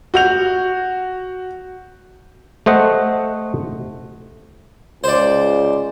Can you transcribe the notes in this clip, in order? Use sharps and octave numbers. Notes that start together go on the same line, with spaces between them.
F#4 G6 F7
A3 C5 D#5 F#5
C#2 C5 D5